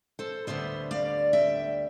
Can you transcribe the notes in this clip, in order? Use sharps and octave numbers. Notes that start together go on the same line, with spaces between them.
A4 C5
D2 D3 G3 B3 C5 E5
D5 F5
E5 G5